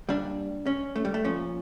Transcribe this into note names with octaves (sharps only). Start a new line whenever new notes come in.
A#2 G3 D4
C#4
A3
G3
A3
A#2 F3 C#4